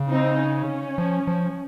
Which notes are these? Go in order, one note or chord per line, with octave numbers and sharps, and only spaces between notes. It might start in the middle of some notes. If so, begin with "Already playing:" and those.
Already playing: C#3
C4 D#4
C#4
F3
F3